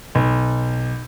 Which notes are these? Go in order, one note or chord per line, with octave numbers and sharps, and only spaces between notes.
B1